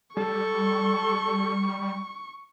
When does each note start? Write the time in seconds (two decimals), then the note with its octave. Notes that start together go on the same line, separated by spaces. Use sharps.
0.17 G3 A4 C#6